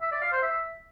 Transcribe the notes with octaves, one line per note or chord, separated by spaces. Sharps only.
E5
D5
F5
C5
E5